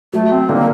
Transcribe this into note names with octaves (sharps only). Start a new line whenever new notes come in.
F#3 A3
C4
D3 A#3